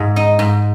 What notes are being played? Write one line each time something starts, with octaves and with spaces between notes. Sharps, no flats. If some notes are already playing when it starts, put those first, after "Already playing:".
Already playing: G#2 G#3
D#4
G#2